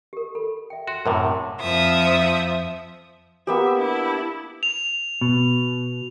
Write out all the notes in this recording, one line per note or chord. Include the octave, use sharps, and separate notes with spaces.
G4 A#4
A4 B5
E5 G5
F#4 C6
F#2 A2 C3 A#4 C5
F2 F3 E5 D#6
A#3 B3 G4 E5
D4 E4
F7
B2